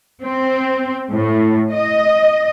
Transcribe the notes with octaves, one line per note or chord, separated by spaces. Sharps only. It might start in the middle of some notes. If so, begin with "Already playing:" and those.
C4
A2
D#5